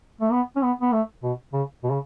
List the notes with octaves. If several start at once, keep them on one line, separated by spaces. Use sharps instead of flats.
A3
B3
C#4
B3
B3
A3
B2
C#3
B2
C#3